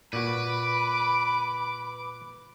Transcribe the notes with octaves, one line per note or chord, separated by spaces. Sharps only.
A#2 F#4 B4 B5 D6